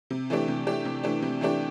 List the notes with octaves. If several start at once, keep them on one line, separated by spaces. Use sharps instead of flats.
C3
E3 A3 D4 G4
C3
E3 A3 D4 G4
C3
E3 A3 D4 G4
C3
E3 A3 D4 G4